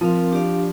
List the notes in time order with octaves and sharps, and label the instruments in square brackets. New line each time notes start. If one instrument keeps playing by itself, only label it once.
[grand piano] F3 [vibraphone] C4 A#4 F5
[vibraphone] D4 G4 D5 F5